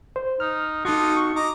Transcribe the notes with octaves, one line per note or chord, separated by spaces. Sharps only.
C5
D#4 F6
D#4 F4 F#4 A4 D6 D#6
C#6
D#5 A#5 D6